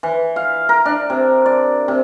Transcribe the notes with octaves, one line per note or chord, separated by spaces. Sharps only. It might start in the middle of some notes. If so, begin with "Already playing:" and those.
E3
F5
A#4
D4
C3
D5
C3